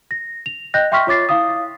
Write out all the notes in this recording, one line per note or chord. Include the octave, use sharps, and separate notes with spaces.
A#6
F7
D#5 G5 F#6 G6 A#6
E5 G5 C6 C#6 F6 B6
F4 C#5 D6 A6 C7
E4 F5 D#6